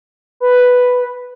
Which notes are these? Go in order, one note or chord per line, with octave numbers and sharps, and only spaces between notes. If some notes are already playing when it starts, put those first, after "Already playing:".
B4